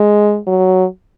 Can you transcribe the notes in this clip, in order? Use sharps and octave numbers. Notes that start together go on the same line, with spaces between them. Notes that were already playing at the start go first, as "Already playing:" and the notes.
Already playing: G#3
F#3